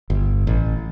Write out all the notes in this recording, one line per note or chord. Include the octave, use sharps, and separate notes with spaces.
G1
A1